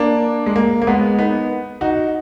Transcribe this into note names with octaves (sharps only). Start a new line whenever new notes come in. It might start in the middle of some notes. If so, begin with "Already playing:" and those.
Already playing: A#3 D4
G#3
A#3
A#3
G#3 B3
B3 D#4
D#4 F#4